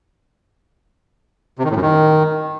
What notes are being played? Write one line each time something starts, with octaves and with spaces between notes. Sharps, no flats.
C3
D#3
A2
F#2
D#3